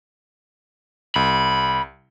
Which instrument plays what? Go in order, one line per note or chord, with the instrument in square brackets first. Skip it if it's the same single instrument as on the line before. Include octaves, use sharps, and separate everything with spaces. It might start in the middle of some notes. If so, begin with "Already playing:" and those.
[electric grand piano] C2 [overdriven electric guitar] B5